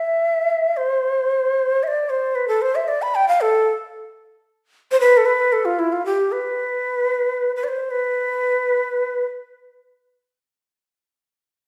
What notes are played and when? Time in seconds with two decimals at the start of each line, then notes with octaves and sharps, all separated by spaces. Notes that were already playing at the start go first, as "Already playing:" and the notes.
Already playing: E5
0.77 C5
1.83 E5
1.88 D5
2.10 C5
2.35 B4
2.48 A4
2.62 C5
2.75 E5
2.88 D5
3.02 B5
3.15 G5
3.28 F5
3.41 A4
4.91 C5
5.00 B4
5.17 A4
5.26 B4
5.53 A4
5.65 F4
5.79 E4
5.92 F4
6.06 G4
6.32 B4
7.56 B4
7.64 D5
7.68 C5
7.91 B4